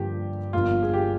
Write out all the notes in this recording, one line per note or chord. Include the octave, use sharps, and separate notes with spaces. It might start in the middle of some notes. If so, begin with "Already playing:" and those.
Already playing: G2 D3 F3 A#3 G4
G1 G2 F3 A#3 F4
G#4
G4